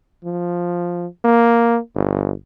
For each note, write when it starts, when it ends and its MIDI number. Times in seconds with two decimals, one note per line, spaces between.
0.25 1.07 53
1.25 1.79 58
1.95 2.32 31